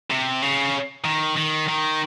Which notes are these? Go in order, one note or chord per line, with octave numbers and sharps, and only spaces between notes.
C3
C#3
D#3
D#3
D#3